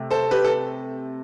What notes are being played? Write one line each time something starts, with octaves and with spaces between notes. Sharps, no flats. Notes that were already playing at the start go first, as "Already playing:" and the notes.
Already playing: C3 A3
A4 C5
G4 B4
A4